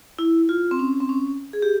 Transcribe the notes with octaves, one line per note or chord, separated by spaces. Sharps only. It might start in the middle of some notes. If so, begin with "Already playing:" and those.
E4
F4
C4
C#4
C4
C#4
G#4
G4